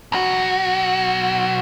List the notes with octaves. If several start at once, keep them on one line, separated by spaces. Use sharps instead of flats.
B1 F#4